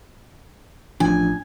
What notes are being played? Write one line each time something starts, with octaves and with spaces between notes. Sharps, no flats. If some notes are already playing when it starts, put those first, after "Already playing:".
A1 F3 D4 G#5